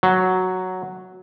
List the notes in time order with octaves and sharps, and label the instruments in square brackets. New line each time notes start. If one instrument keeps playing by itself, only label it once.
[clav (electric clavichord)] F#3